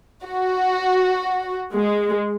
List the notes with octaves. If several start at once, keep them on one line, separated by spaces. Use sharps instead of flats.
F#4
G#3